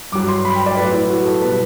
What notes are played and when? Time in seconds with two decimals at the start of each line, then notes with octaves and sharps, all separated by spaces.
0.12 G2 F#3 D6
0.28 C6
0.45 B5
0.55 G5
0.66 D5
0.77 A2 F#3 B4
0.93 E4
1.10 F#4
1.25 A4
1.42 B2 G3 B4